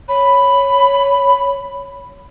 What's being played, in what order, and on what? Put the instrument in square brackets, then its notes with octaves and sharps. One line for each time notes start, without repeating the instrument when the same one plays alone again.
[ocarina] C#5 [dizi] B5